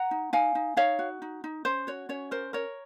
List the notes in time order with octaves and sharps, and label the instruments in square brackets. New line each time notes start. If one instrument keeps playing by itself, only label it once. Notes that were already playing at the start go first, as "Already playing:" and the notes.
Already playing: [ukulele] F#5 A#5
D#4
D#4 F5 G#5
D#4
D#4 C#5 F5
F#4
D#4
D#4
C#4 C5
F#4 C#5
C#4 C#5
A#4 C5
A#4 C#5